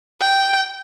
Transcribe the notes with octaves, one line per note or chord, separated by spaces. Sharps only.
G5